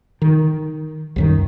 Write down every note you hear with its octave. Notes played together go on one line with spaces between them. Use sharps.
D#3
C2 F#2 D#3